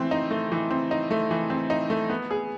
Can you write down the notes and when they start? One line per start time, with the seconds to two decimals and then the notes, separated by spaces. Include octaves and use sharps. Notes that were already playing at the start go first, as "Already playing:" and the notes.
Already playing: E3 A3 C4
0.11 D#4
0.31 A3
0.52 E3
0.70 C4
0.91 D#4
1.11 A3
1.31 E3
1.50 C4
1.70 D#4
1.90 A3
2.10 B3
2.31 G#4